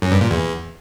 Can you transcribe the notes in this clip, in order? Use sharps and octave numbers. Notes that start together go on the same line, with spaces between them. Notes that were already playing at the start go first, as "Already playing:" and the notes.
F#2
G2
A#2
E2